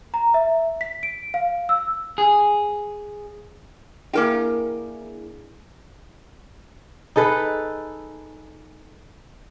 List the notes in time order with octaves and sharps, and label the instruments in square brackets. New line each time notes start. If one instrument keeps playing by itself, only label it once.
[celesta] A#5
E5
B6
D7
F5
E6
[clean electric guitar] G#4
[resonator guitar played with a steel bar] A#3 A#4 G5 [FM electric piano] D4 E4 G#4
[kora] D#4 G#4 A4 B4